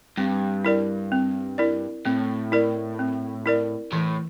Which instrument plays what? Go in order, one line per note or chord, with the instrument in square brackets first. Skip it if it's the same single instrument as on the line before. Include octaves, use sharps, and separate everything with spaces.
[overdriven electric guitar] G2 [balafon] C4
[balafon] E4 A#4 D5
C4
E4 A#4 D5
[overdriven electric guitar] A2 [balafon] C4
[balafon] E4 A#4 D5
C4
E4 A#4 D5
[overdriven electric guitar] A2 [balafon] E3